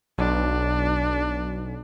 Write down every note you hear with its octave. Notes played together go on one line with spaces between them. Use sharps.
B1 D4